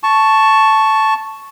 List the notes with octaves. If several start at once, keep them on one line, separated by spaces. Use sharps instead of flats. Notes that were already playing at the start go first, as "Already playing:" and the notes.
A5 C#6